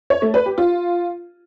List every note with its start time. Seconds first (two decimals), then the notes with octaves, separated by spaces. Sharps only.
0.10 C#5
0.22 A3
0.34 B4
0.46 G4
0.58 F4